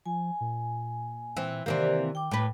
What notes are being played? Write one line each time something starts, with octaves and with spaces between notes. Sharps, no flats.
F3 G#5
A#2
E3 C4
C3 D#3 E3 A#3 G4 C5 D5
G5 D6
A2 B4